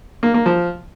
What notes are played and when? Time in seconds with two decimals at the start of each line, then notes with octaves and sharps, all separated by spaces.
0.23 A#3
0.34 A#3
0.46 F3